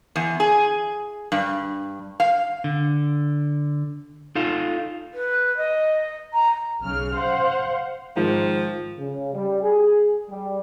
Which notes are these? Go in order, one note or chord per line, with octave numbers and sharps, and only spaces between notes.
E2
G#4
G2
F5
D3
D#4 F4 A4 F5
B4
D#5
A#5
B1 C#3 F6
C5 F5 F#5
G#2 D#3 F3
C#3
G3
G#4
G3